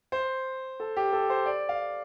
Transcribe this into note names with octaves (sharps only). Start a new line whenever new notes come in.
C5
A4
G4
A4
C5
D5
F5